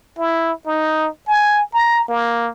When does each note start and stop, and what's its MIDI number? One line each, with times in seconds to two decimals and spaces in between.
0.19 0.52 64
0.66 1.08 63
1.27 1.62 80
1.74 2.05 82
2.08 2.49 58